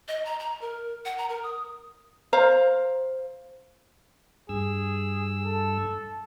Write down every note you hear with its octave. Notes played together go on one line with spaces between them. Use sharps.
D#5
A#5
A#5
A#4
F#5
A#5
A#4
D#6
C5 F5 A#5
G2 G#4 E6
A4